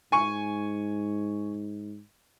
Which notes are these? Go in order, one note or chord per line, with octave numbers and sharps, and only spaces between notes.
G#2 G#5 C#6